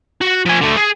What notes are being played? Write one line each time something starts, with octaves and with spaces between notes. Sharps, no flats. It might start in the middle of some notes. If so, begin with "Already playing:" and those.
F#4
F3 G#5
D3 A3
G#4